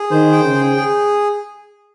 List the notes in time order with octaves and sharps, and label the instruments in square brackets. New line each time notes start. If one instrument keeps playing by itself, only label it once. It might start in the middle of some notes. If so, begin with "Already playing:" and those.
Already playing: [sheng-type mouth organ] G#4
[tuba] D#3 [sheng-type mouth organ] C5
[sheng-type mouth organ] G5
[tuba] C#3
[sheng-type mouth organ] G#4
G#4